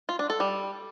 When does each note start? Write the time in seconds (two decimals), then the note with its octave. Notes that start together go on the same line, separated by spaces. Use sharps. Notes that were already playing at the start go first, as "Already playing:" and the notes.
0.09 F4
0.19 D4
0.30 A4
0.40 G3